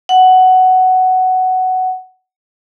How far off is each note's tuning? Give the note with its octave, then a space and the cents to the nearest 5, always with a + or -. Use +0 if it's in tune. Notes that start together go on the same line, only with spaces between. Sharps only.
F#5 +10